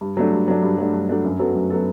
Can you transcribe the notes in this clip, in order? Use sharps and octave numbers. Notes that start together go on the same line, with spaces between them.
G2
F#3 A3 D4
G2
F#3 A3 D4
G2
F#3 A3 D4
G2
F#3 A3 D4
F#2
F#3 B3 F#4 A4
F#2
F#3 B3 F#4 A4